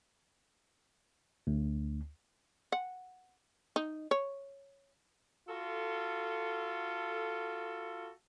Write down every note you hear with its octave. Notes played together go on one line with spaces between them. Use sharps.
D2
F#5
D#4
C#5
F4 F#4 A4